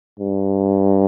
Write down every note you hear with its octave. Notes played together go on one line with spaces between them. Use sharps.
G2